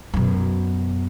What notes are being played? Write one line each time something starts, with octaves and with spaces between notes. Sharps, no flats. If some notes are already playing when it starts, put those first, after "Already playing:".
F#2 B2